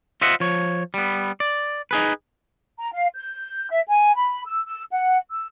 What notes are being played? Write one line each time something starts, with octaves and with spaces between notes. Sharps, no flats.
F4 C5 D#5 E5 F#5
F3 C#5
G3 B3
D5
D#4 G#4 B4
A#5
F5
G6
E5
G#5
B5
E6
E6
F#5
E6